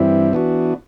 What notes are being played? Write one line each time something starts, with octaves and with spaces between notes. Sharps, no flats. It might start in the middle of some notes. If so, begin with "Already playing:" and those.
Already playing: G2 E3 G3 C4 E4
E3 B3 D4 F#4